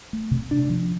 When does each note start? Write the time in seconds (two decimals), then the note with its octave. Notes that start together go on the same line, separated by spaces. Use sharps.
0.13 A3
0.31 C3
0.51 D4
0.69 F3